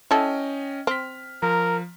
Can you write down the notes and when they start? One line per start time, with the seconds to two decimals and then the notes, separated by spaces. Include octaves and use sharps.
0.11 C#4 E4 A4 D#5 G5
0.87 C4 F6 B6
1.42 F3 A#4 A#5